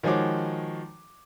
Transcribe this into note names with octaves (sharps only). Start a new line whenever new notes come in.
D#3 F3 G#3 F#4 C#5 D6